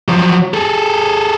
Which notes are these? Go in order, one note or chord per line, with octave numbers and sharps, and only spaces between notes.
F3 F#3
G#4 A4